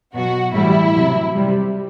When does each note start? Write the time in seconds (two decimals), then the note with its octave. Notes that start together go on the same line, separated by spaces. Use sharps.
0.14 B2 F#3 F#4
0.54 A2 E3 G3 E4
0.95 C3 F#3
1.36 C3 G3